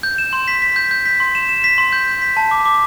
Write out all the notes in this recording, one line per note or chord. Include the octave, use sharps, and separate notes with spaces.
G6
E7
C6
B6
B6
G6
G6
B6
C6
E7
E7
B6
C6
G6
G6
B6
A5
D6
D6